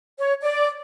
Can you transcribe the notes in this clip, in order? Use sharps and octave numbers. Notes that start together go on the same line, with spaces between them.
C#5
D5